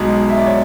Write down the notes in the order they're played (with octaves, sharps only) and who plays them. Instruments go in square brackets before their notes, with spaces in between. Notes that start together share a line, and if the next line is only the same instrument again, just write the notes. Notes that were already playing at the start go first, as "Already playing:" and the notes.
Already playing: [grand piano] B1 B2 G#3
E5
D5
C#5